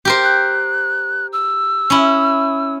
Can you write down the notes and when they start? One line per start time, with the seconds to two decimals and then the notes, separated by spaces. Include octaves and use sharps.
0.05 G4 A#4 C5
0.23 F#6
1.33 E6
1.90 C#4 E4